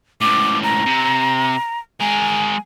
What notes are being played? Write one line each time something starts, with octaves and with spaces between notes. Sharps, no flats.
C#2 A2 D6
A#5
C3
G#3 A#4 G#5